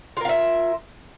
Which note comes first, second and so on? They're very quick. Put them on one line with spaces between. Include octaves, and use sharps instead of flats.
F4 A#4 F5 E5